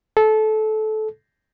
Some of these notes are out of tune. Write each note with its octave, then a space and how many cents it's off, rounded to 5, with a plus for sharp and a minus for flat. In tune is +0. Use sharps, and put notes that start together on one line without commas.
A4 -20